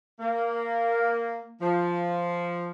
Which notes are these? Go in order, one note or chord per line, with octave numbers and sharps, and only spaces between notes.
A#3
F3